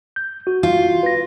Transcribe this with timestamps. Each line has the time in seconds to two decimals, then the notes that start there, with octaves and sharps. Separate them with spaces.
0.16 G6
0.47 F#4
0.63 F4
1.03 B4 A#6